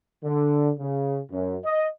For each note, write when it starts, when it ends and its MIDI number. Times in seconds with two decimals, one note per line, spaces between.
0.24 0.71 50
0.79 1.19 49
1.32 1.57 42
1.64 1.87 75